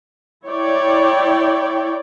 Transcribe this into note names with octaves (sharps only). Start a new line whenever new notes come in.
E4 C#5 D5 G5